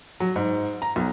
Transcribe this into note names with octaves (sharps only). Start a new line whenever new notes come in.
F#3
G#2
A#5
B1